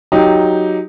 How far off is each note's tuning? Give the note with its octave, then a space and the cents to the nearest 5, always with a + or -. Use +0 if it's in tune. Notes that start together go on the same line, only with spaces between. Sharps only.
F#3 +0 D#4 +0 G4 +0